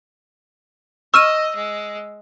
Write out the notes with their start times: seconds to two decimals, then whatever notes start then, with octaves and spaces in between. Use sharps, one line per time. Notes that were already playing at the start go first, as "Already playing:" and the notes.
1.14 D#5 C#6 E6 F6 D#7
1.55 G#3